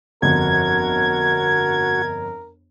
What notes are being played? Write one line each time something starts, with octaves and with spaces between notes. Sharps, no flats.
G1 F2 F#4 A#4 G#6